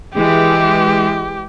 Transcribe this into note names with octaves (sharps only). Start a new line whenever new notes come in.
E3 G#3 G4